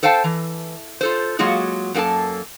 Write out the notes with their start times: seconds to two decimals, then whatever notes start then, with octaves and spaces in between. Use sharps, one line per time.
0.03 A4 C5 F5 G5 A5
0.24 E3
1.01 F4 A4 C5
1.39 F#3 G#3 A#3 F4 F#4 G#4
1.94 F#2 A#3 F#4 A4 A5